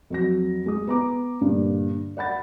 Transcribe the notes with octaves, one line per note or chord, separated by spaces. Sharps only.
F2 F#3 A#6
G#3 D#6
B3 A#5 D6
G2 A#2 D3
D5 F#5 B5 A6